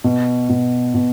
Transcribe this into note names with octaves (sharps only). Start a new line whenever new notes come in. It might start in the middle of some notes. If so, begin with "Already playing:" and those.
B2
B2
B2